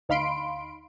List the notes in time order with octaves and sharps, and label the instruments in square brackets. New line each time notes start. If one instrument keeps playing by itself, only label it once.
[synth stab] D2 D#4 F5 B5 C6 D7